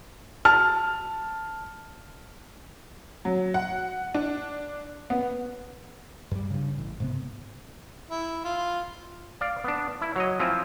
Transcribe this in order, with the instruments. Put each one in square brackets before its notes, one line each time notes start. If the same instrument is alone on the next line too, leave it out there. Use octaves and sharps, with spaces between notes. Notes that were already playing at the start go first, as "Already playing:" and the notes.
[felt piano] A5 F6
[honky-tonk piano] F#3
F#5
D4
B3
[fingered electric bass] G2 G3
G2 C#3
A1
G#2 C3 B3
[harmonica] E4
F4
[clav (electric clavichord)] D5 F5
B3 D4
E4
F#3 C#5 D#5
F3 C4 E4 F4 G#5